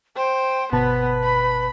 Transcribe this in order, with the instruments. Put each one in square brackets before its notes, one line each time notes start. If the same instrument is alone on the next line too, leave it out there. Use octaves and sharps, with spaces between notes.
[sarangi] C5 [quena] G5
[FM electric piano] G1 B2 A5 [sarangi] B3 [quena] B4
[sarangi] B5